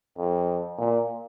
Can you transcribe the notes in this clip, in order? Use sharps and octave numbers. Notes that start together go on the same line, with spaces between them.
F2
A#2